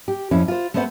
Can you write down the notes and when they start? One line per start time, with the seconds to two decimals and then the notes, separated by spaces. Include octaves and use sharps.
0.08 G4
0.31 F2 C#4 E4
0.48 F4 C5
0.74 A3 B3 B4 C5 D5 F#5